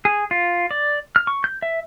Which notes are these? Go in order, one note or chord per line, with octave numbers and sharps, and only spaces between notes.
G#4
F4
D5
F6
C#6
G6
E5